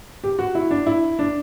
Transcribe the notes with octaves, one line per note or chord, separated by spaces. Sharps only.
G4
F#4
E4
D4
E4
D4